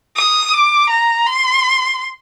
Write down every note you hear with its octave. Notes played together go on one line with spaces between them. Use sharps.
D#6
D6
A#5
C6